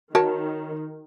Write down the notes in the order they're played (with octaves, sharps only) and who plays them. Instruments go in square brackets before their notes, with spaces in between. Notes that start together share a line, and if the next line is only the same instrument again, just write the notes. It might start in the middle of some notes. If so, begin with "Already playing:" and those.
[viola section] D#3 [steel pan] F#4 [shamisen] A#4 C#5 A5